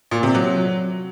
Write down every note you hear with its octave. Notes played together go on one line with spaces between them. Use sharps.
A#2
C3
F#3